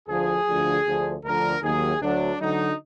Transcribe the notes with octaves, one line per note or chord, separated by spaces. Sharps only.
D2 D3 F3 G#4
D2 D3 F3
D2 D3 F3
D2 D3 F3 A#4
D#2 D#3 F#3 G#4
D2 D3 F#3 D4
D2 D3 F#3 D#4